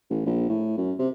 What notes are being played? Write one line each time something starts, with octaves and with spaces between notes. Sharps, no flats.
A1
A#1
A2
F#2
C3